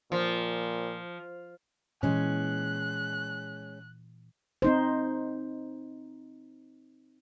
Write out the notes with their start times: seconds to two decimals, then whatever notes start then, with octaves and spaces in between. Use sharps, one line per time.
0.12 A#2 F3
2.03 A#2 E3 G#3 C#4 F#6
4.62 C4 D#4 C5